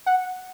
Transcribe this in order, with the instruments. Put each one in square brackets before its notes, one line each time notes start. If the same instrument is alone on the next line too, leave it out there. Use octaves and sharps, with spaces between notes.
[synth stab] F#5